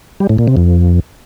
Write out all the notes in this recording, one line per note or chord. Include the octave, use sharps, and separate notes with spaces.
G3
A2
A#2
C3
F2